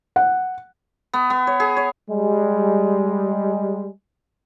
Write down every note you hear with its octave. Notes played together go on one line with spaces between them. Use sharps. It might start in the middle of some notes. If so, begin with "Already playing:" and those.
F#5
B3
B3
C#5
G#4
C#5
G3 G#3